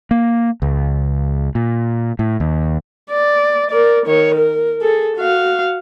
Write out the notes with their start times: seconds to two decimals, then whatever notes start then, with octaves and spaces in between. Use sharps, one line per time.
0.11 A#3
0.62 C#2
1.55 A#2
2.19 A2
2.40 D#2
3.11 D5
3.71 A#4 D5
4.06 D#3 C#5
4.35 A#4
4.82 G#4 A4
5.17 F#4 F5